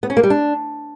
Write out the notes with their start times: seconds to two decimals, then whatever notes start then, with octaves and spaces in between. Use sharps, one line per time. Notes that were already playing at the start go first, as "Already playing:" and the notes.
0.03 B3
0.10 C#4
0.17 A#3
0.23 G3
0.30 D4